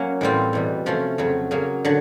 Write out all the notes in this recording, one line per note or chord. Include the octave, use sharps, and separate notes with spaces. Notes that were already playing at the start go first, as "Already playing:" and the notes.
Already playing: F#3 A#3 C#4
A2 E3 G3 C4 F4
E2 B2 G3
C3 F3 A3 C#4
F2 C#3 F#3
C#3 F#3 A#3
D3 F#3